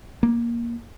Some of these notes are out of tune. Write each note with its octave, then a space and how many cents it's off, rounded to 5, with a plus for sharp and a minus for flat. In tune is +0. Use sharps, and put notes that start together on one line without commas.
A#3 +10